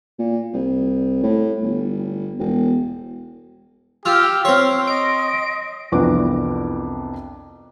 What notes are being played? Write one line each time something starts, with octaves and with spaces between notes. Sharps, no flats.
A#2
C2
A2
G1
E1
F4 G4 E6 F6
C4 C#5 C6
D#5 D7
C2 F2 E3 B3 D4 D6